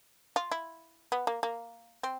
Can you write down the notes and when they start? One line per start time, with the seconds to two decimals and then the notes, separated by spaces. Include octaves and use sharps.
0.36 F4
0.51 E4
1.12 B3
1.27 A#3
1.43 A#3
2.03 C4